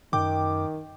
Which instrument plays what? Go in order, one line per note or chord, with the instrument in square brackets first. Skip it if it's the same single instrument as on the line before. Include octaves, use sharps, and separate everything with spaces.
[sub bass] F#2 [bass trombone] D#3 [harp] G5 [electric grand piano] D6